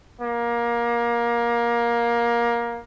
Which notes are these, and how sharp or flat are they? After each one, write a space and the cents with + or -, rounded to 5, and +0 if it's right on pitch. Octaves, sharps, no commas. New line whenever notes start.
A#3 +20